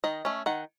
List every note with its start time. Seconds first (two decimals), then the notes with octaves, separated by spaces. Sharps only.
0.04 D#3 D#5
0.25 A3 C#4
0.46 D#3 F#5